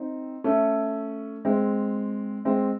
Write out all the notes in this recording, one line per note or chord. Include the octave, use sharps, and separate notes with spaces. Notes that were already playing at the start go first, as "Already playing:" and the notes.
Already playing: C4 D#4
A3 C#4
G#3 C4
G#3 C4